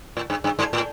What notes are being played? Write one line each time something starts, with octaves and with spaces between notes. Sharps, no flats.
A2
G2
G2
G#2
A2